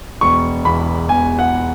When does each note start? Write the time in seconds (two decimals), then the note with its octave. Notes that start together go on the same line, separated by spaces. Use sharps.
0.21 E1 C#6
0.65 E2 B5
1.09 E1 G#5
1.39 F#5